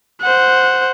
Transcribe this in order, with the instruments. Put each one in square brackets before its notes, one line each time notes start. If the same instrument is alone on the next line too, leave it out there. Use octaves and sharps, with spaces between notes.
[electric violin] C5 F#5